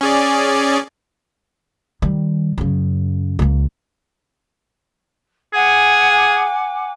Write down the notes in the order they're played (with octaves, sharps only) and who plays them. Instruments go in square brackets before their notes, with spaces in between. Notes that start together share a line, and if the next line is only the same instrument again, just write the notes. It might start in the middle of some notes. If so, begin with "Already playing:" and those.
[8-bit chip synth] C#4 G#4 D5
[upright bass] D#3 G3
F#2 C#3
C#2 A#3
[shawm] G#4 [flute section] F#5 G#5 D6